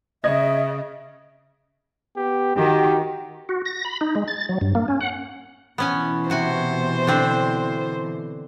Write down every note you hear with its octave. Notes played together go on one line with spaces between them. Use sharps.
C#3 D#5 E5 G#6
B3 G4
D#3 F#4 G4
F#4
A#6
B5
D#4
G#3
A6
F#3
G2
A#3
C#4
F#5
B2 E3 B3 C#4 G#5
C3 F#4 C5 G#5
D3 C4 D4